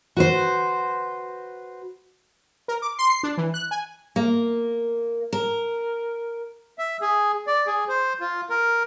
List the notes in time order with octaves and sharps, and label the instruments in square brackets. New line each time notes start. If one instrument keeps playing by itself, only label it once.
[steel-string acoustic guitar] F#4 B4 C5
[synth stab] A#4
D6
C6
C7
D4
E3
F#6
G#5
[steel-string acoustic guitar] A#3
A#4
[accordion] E5
G#4
D5
G#4
C5
F4
A#4